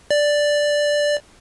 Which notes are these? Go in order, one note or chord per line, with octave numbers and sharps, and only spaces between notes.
D5